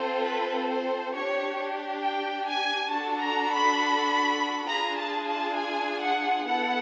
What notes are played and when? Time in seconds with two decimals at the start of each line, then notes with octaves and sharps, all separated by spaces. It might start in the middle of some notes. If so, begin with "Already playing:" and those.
Already playing: C4 F4 A4 C5
0.25 B4
0.69 C5
1.13 D4 G4 C#5
2.01 G5
2.46 G#5
2.90 D4 F#4 A4 A5
3.21 A#5
3.50 B5
4.67 D4 F4 G#4 A#5
4.98 A5
5.27 A5
5.57 G#5
6.01 F#5
6.44 B3 E4 A4 F#5